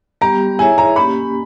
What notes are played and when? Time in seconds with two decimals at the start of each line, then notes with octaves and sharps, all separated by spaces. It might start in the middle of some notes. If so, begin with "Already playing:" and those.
0.21 G3 B3 G4 A#5
0.59 E4 G#4 C#5 E5 G#5
0.78 A#5
0.96 A#3 C#4 G4 B5